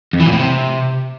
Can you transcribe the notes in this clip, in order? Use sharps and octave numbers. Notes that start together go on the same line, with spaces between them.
F2
E3
A#2
A2
C3